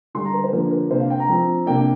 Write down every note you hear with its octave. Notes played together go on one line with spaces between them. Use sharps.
D3 G3 D4 C6
A#5
A#4
C5
D3 F3 A#3 D4 A#4
A#4
C3 A#3 D4 C5
F5
G5
A#5
F3 C4
C3 A#3 D4 G5